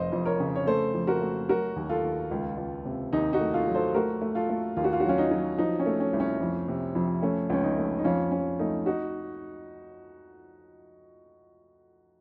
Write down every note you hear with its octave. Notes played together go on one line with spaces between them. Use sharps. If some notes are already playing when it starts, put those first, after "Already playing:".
Already playing: F1 C5 D#5
F2
A#4 C#5
C#3
C#5
A3 A4 C5
F2
F#4 A#4
A3
F#3 F#4 A#4
D#2
F4 A4
D#2
C#2
C#2
C3
D#2 D#4
D#4 F#4
A3
F4 A4
F#3
A4 C5
A3 F#4 A#4
A3
F4 A4
A3
D#2 F4
F#4
F4
F#4
F#3 C#4 F4
D#4
F#3
F3 D#4
C#4
A3
C#4
C2
C#4
F2
C3
F2
A3 C#4
C#2 C#4
D#4
A3
D#4
F2 C#4 F4
F2 C#4
A3 D#4
D#4 F#4